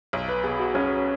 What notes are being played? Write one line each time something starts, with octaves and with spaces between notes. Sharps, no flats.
B1
B4
B2 B3 G#4
F#4
B1 C#4